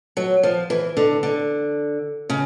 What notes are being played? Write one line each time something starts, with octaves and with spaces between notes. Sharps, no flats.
F#3
F3
E3
D3
D3
C#3